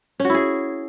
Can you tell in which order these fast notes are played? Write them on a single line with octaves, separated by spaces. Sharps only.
C#4 F#4 E4 G#4